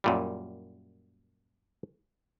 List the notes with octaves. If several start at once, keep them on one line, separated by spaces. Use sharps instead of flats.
F#2 A#2 G3